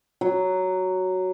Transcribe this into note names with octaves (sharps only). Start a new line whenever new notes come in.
F#3